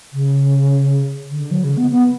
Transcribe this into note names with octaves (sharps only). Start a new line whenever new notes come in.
C#3
D3
F#3
C#3
B3
B3